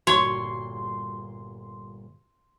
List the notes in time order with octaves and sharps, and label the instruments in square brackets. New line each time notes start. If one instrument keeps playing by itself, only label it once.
[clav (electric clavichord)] G1 A#2 [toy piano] F#4 [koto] C#5 [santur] C6